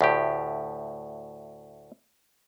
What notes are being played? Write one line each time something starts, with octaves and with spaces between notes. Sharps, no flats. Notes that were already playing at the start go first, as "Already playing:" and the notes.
D2 A2 G4